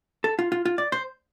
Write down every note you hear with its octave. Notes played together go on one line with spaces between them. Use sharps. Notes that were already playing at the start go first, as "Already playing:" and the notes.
A4
F4
F4
F4
D5
C5